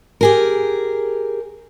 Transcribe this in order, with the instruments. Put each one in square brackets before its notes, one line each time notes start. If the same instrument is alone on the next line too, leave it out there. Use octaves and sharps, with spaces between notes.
[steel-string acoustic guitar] G4 G#4 A#4